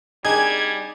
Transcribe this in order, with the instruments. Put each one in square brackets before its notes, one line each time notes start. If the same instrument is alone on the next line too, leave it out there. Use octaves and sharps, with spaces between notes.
[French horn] G3 [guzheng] D4 D#4 [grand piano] G#4 [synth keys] G#6